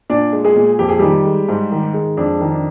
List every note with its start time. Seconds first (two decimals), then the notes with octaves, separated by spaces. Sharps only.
0.10 A#2 D4 D5
0.33 G#3
0.44 G#3 G#4
0.56 A#2
0.79 F2 G4
0.89 G#4
0.99 D#3 G3 G4
1.25 G#3
1.49 G#2
1.72 D#3
1.94 G#3
2.17 F2 D4
2.40 D#3
2.52 D4